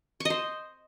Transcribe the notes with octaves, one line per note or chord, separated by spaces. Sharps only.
C5 D#5 C#6